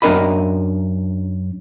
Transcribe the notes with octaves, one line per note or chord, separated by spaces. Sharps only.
F#2 D4 A#4 D#5 B5